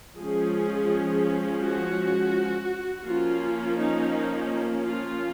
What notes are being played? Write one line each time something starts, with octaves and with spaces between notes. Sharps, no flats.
F3 G#3 C#4 G#4
F#4
F3 A#3 C#4 F4
D#4
F4